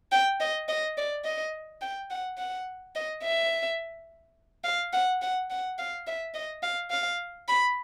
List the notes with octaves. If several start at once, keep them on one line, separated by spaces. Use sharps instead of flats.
G5
D#5
D#5
D5
D#5
G5
F#5
F#5
D#5
E5
F5
F#5
F#5
F#5
F5
E5
D#5
F5
F5
B5